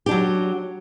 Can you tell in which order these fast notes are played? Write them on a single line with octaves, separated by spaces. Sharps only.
G4 D4 F#3